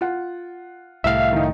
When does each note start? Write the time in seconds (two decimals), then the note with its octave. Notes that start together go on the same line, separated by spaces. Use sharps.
0.01 F4 F#5
1.04 C2 A2 E5 F5
1.33 D#3 D#4